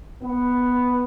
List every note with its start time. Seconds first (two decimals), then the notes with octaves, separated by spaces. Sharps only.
0.23 B3